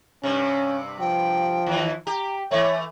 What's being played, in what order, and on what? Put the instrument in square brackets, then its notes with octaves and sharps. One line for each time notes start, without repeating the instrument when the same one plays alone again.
[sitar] G2 C3 [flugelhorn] C#4
[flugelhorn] F3 [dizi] G5
[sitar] D#2 E3
[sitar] G4 [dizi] A#5
[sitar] E3 A3 [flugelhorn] C#5 [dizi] E5